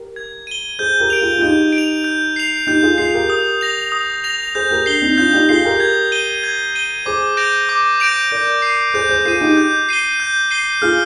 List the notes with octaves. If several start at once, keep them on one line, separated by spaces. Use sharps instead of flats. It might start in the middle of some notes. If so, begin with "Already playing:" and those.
Already playing: G4 A#4
G#6
D#7 G7
G#4 C5 G6
G4 A#4
D7 F7
F4 G#4
F4
D#4 G4 G6
D7
F7
G6
C7 F7
D#4 G4 G6
F4 G#4
F4 G#4 C7 F7
G4 A#4
D#6
A#6 F7
D#6
A#6 F7
G#4 C5 G6
G4 A#4
D4 C7 G7
C4 D#4
D4 F4 G6
D#4 G4
F4 G#4 C7 G7
G4 A#4
G#6
D#7 G7
G#6
D#7 G7
G#4 C5 D6
G6 A#6 D7 F7
D6
G6 A#6 D7 F7
A#4 D5 G6
C7 D#7
G#4 C5 G6
G#4 C5
F4 G#4 C7 D#7
D#4 G4
G6
C7 D#7 G7
G6
C7 D#7 G7
F4 G#4 F6